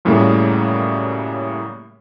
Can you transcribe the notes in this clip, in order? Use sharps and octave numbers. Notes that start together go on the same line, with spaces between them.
F#2 A2 C#3 G3 A3 A#3